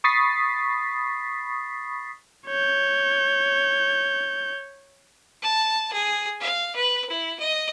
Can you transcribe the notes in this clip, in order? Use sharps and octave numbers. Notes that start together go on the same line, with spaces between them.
B5 C#6 D#6 A6 B6 C7
C#5 G6
A5
G#4
F5
B4
E4
D#5